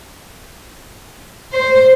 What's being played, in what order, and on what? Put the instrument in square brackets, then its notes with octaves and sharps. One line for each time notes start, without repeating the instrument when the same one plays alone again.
[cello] C5